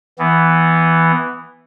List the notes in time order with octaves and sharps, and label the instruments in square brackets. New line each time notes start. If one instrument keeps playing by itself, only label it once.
[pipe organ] E3 B3